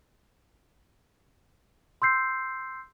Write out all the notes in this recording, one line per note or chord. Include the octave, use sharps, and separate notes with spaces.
C6 E6 G6 C7